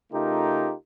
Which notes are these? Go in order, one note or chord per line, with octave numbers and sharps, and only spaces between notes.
C#3 A3 D#4 F4 G4 A#4